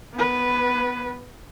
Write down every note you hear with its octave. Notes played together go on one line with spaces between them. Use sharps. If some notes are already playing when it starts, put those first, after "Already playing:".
B3 B4